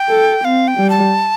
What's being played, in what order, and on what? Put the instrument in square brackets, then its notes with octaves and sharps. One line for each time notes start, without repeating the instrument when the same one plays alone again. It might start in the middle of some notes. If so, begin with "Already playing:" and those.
Already playing: [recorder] G5
[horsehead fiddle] A4
[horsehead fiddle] C4 [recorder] F5
[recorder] G5
[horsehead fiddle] G3
[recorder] A5